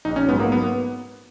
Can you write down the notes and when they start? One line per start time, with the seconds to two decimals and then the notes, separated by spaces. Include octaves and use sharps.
0.05 A#1 D#4
0.16 C#4
0.28 G#2 B3
0.32 F#3
0.40 A#3
0.52 B3